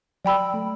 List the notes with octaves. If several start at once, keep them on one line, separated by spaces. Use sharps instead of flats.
F#3 D5 G5 B5 E6
A3